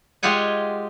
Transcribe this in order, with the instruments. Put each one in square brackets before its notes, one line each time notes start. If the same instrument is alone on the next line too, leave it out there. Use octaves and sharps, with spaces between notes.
[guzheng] G#3 F4 G4 G#4 F#5 G#5